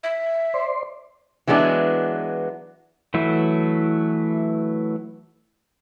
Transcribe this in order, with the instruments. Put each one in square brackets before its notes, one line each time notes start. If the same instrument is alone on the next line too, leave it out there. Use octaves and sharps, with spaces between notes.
[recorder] E5
[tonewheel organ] C5 D5 C6
[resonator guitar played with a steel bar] E3 F#3 G#3 B3 D4
[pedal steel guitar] E3 F#3 A3 E4